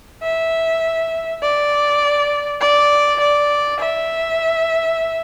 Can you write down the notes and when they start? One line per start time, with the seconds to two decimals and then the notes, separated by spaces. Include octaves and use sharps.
0.23 E5
1.42 D5
2.61 D5
3.20 D5
3.80 E5